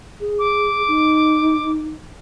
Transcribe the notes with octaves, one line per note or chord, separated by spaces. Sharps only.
G#4
D6
D#4